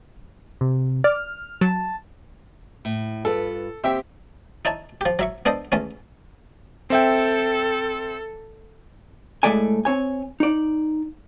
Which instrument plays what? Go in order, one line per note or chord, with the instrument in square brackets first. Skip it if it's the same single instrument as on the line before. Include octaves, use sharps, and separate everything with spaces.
[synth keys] C3
[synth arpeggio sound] D5 [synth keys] F6
[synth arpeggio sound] F#3 [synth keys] A5
[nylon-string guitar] A2
[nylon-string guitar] G2 F4 B4 [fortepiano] A4
[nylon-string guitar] D#2 G5 [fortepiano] C4 G4 E5
[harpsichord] D#4 E4 C#5 A5
F3 G4
F#3 E5 C#6
B3 D4 A4 C5 D#5
E2 A3 C#4
[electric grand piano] C4 E5 G5 [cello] A4
[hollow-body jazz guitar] A2 G#3 A3 D5 G#5
C4 C#5 G#5
D#4 D5